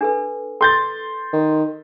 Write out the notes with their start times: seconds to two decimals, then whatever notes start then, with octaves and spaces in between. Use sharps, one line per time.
0.01 D4 A4 B4
0.61 A4 C6 G6 A6
1.33 D#3